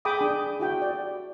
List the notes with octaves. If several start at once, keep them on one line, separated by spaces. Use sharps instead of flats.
G#4 G5 B5 D6 D#6
D4 G#4
E4 F#4 G5
D5